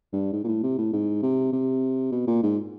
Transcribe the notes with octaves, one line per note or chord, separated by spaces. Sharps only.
G2
G#2
A#2
A2
C3
A2
G#2
C3
C3
B2
A#2
G#2